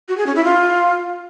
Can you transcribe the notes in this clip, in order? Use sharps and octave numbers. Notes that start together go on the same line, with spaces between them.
F#4
G#4
C#4
E4
F4